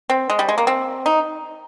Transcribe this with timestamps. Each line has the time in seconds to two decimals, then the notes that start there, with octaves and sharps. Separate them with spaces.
0.10 C4
0.30 G#3
0.39 G3
0.49 G#3
0.58 A#3
0.67 C4
1.06 D#4